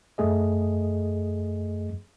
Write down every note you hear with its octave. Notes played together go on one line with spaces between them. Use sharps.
F#2 A3 G#4 D#5